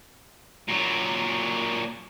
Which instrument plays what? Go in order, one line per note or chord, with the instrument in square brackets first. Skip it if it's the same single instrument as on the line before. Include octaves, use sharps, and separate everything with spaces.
[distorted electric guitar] A#2 F#3